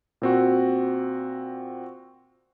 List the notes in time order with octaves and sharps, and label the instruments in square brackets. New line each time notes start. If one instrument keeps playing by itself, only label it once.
[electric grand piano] A#2 C4 F#4